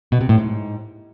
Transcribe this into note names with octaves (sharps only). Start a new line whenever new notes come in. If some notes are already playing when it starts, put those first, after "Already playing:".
B2
C3
A2
G#2